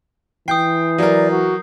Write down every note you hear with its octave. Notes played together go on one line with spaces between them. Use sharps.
E3 G5 D#6 G6 C7
F#3 A#4 D5
F#4